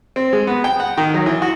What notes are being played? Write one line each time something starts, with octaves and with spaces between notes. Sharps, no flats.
C4
G#3
B3
G5
F#5
D#3
F#3
E3
F#4